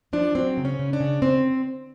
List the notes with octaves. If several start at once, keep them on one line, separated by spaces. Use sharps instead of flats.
F3 D4
F#3 C4
C#3
C#4
C#3
D4
C#3
C#3 C4